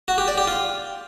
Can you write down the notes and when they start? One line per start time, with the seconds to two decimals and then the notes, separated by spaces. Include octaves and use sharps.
0.08 F#4
0.18 G4
0.28 D5
0.38 G4
0.47 F4